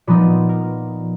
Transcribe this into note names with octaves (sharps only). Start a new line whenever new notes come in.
A#2 F3 B3 D#4 B4
A#4